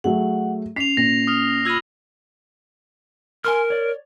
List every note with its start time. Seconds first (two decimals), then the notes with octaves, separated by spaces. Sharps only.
0.04 F#3 A3 G#4 F#5
0.76 C#4 B6 C7 F7
0.97 A#2 A#6
1.27 D#6 F6 F7
1.65 F4 B5 E6 G#6 D#7
3.45 A#4 G#5 C6 F6
3.70 C#5 D5